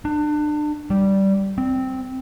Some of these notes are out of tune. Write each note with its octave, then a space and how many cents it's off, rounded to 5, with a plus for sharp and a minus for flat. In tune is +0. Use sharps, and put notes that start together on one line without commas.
D4 +30
G3 -10
C4 -5